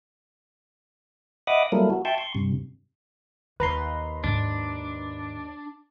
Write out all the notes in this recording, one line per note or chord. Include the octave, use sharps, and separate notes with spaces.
D#5 E5 F#5 B5 D6 D#6
F#3 G3 A#3 E4 A4 A#4
F#4
E5 G5 A5 C6 C#6
C6 C#6
G2 C3
D#2 D#3 B4 A#5 C6
G#2 D#3 D4